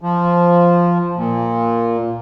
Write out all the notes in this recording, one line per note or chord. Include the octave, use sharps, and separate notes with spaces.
F3
A#2